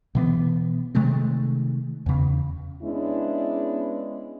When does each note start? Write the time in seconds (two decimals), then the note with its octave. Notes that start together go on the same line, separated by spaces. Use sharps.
0.15 B2 E3 B3
0.95 C3 D#3 G#3 A3
2.06 E2 C#3
2.83 G#3 B3 C#4 D4 E4